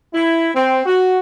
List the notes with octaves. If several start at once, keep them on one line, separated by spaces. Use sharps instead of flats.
E4
C4
F#4